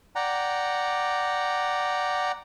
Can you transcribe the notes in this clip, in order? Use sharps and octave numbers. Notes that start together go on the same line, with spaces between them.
D5 F#5 G5 A#5